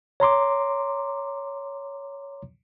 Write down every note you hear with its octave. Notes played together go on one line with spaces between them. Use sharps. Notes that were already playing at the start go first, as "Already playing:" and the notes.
C#5 A#5 C6 D6